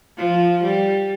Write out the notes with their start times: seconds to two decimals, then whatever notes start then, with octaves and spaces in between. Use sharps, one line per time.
0.18 F3
0.63 G3